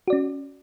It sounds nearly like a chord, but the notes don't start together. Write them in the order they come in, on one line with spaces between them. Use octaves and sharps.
F#4 D5 C#4